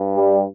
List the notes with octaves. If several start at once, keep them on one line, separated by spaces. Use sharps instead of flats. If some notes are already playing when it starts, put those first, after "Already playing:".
Already playing: G2
G3